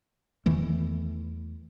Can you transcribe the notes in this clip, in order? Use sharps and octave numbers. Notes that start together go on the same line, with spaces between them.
E2 D#3 E3 A3